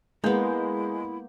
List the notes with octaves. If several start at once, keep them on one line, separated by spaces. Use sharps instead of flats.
G#3 A#3 B3 E4 G6